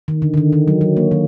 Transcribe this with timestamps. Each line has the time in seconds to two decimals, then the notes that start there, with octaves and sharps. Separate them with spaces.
0.08 D#3
0.22 D3
0.34 D3
0.37 D#3
0.53 D#3
0.68 F#3
0.81 F#3
0.97 A#3
1.11 D#3